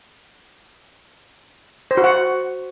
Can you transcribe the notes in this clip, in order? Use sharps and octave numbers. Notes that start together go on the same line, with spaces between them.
C5
F#4
F#5